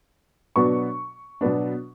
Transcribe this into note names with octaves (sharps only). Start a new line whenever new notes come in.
B2 F#3 B3 D4 C#6
B2 F#3 B3 D4